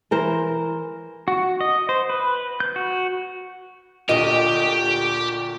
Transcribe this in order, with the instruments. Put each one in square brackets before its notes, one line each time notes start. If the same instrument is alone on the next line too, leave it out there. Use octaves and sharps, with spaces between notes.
[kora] E3 A#4 C5
[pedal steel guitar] F#4
D#5
C5
B4
G6
F#4
[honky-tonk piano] D2 A#2 [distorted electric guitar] G4 [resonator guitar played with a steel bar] D#5